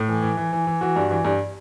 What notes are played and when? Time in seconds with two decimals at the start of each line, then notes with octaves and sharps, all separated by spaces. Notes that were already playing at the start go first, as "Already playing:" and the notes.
Already playing: A2
0.09 E3
0.22 E3
0.37 E3
0.53 E3
0.67 E3
0.81 E3 F#4
0.96 G2
1.11 E3
1.25 G2